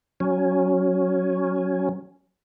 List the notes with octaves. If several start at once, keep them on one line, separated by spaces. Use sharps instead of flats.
F#3 C#4